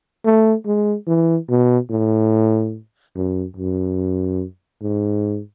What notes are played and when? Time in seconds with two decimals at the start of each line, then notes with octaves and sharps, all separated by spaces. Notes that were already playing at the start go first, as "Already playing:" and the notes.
0.25 A3
0.66 G#3
1.07 E3
1.49 B2
1.90 A2
3.15 F#2
3.57 F#2
4.82 G#2